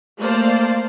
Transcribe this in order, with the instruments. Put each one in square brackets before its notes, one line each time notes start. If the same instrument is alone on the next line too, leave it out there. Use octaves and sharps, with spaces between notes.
[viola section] A3 A#3 C5 D5 F5 A5